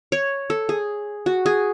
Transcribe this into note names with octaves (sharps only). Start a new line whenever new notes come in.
C#5
A4
G#4
F#4
G#4